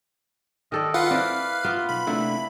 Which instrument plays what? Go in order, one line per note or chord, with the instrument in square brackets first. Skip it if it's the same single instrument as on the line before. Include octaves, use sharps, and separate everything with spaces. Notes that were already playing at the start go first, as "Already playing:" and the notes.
[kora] D#3 A4 D5 [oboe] D#5
[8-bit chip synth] F4 F5 F#5 [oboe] B4
[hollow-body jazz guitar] C4 E4 [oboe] B4 [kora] D5 [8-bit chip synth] F5
[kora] A#3 B3 F4
[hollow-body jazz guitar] B1 [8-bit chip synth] B5
[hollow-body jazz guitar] C3 A3 D4 [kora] E4